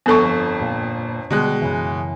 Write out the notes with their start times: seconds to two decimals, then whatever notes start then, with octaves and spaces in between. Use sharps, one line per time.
0.06 G1 F2 B3 A4 C#6
0.61 A#2
1.30 B2 D3 G3 G#3 F#6
1.62 F#2 C#3 E3